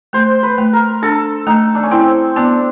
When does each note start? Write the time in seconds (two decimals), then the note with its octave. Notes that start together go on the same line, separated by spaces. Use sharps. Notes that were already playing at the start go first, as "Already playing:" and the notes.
0.13 A3 C5
0.43 B4
0.58 A3
0.73 A#4
1.02 D4 A4
1.47 A3 D#4
1.75 D4
1.83 C#4
1.91 C4 E4
2.36 B3 D4